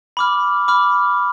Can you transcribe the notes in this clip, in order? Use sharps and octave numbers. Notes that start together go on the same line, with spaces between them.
B5 D6 F6
B5 D6 F6